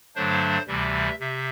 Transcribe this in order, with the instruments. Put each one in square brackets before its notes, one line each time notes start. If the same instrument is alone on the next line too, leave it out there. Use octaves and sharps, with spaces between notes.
[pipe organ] G2 D3 F#3 A3 D4 C5
D2 C3 E3 G3 E5
C3 E5